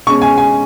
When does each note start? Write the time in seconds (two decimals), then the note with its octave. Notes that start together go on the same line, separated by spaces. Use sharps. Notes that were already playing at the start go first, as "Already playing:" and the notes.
0.07 B2 G#3 C#4 C#6
0.22 G#5
0.38 G#5